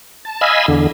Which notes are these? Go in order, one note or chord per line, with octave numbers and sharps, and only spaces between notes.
A5
D#5 F5 G#5 B5 E6
E2 D3